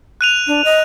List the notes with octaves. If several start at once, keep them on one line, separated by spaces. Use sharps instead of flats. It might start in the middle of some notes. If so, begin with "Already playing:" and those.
F#6 D#7 F7
D4
D#5